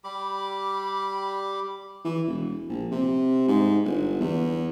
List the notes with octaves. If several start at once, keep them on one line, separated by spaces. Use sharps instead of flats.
G3 G4 B5 D6
E3
E1
A#1
C3
G#2
G1
E2